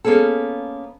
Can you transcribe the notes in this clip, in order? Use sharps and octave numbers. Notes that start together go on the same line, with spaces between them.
A#3 B3 C#4 G#4 A4